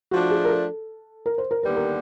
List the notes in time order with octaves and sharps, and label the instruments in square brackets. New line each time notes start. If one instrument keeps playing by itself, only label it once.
[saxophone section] F3 A3 D4 [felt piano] F#4
[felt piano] G#4
A#4
A4
A#4
C5
A#4
[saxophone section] D#2 D3 G3 B3 [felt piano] B4
[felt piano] A#4